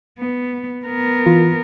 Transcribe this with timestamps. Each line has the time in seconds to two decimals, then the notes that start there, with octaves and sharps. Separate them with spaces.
0.19 B3
0.86 B3 A#4
1.26 E3 F4